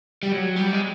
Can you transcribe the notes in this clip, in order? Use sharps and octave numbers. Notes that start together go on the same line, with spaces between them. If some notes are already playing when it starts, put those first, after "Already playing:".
G3
F#3
G3
G#3